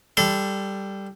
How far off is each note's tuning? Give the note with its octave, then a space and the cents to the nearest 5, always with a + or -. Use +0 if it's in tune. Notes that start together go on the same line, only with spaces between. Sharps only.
G3 +0 A4 +0 C6 -35